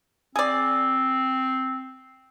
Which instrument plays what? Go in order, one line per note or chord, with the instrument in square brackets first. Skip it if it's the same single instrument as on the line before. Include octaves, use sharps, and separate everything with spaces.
[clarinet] C4 [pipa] G#4 D5